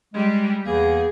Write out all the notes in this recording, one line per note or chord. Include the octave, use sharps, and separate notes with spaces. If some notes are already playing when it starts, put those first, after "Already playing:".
G3 G#3
E2 E3 A#3 G#4